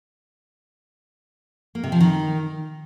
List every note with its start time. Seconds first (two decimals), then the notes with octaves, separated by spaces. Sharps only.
1.75 A#3
1.84 C3
1.92 F3
2.01 D#3